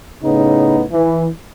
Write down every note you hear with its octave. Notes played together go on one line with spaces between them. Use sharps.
A2 C#3 B3 D#4
E3